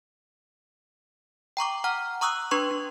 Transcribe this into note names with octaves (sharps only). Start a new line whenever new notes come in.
G5 A#5 C#6 D6
F#5 A#5 F6
A#5 C#6 D#6 E6 F#6
D4 B4 C6 C#6
D4